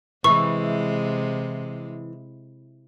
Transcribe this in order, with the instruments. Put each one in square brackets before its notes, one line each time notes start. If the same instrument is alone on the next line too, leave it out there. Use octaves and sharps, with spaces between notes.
[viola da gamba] C3 G#3 [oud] E3 [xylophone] C#6